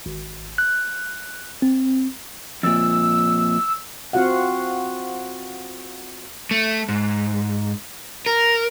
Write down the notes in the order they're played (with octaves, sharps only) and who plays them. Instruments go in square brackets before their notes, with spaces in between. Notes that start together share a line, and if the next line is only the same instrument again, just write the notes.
[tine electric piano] G#1
F#6
C4
[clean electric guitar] F2 A#2 [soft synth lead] E6
[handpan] C4 F4 F#4 F5 F#5
[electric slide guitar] A3
G#2
A#4